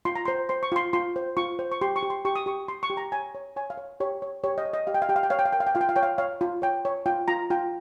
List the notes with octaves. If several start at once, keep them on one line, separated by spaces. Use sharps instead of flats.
F4 C6
A#5
C5 C6
C5 C6
C#6
F4 C6
F4 C6
C5
F4 C#6
C5
C#6
G4 C6
C#6
G4
C6
G4 C#6
D#6
G4 C#6
G4 C6
C#6
G4
A#5
C#5 G#5
C#5
C#5 G#5
F5
C#5
G4 C#5
C#5
G4 C#5
D#5
C#5
D#5
G4 F5
G5
F5
G4 G5
F5
G5
C#5 F5
G5
F5
A#4 G5
F5
G5
F4 F5
G5
F5
C#5 G5
F5
C#5 F5
F4
C#5 G5
C#5
F4 G5
F4 A#5
F4 G5